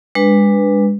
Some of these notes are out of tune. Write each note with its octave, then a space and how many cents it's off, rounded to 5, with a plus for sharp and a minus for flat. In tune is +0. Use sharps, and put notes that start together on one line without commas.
G#3 -30 D4 +0 B4 +0